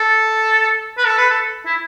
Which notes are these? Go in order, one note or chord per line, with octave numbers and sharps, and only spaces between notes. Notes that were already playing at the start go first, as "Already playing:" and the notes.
Already playing: A4
B4
A4
B4
A4
E4